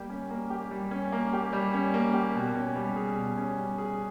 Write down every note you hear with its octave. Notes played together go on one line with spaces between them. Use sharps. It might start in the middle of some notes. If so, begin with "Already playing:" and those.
Already playing: G3 A#3 G4
C#4
A#3
G4
G3
C#4
A#3
G4
G3
C#4
A#3
G4
B2
C#4
G3
G#4
B2
C#4
G3
G#4